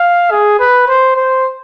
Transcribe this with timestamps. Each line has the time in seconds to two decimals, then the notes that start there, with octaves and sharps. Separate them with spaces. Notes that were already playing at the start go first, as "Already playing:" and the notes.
Already playing: F5
0.31 G#4
0.60 B4
0.88 C5
1.16 C5